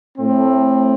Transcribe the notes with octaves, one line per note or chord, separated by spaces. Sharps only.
A2 A3 C4